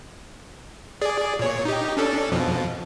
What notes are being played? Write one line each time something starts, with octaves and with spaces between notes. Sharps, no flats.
G#4 D5
A#2 C#5
D#4 G4
C#4 D4 A4
F2 B2 F3